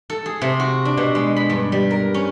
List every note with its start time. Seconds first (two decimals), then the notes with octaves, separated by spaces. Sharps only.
0.10 A4
0.26 G#4
0.42 C3
0.60 F#4
0.85 D4
0.97 B2
1.15 G#3
1.36 B5
1.50 G2
1.72 G3
1.91 A#4
2.14 C#4